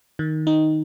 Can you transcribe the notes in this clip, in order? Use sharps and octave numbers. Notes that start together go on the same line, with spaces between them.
D#3
D#4